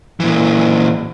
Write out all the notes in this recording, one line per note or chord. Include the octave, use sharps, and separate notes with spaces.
A#2 E3